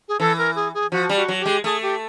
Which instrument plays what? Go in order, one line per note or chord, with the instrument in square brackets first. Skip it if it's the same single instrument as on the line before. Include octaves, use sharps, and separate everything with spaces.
[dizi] G#4
[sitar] E3 [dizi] A4
[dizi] A#4
G#4
G#4
[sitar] F3 [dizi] F#4
[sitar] G3
[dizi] F#4
[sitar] F#3
[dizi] G4
[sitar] G#3
[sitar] A3 [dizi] G#4
[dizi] G4